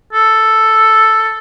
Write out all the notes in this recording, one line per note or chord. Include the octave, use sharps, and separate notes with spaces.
A4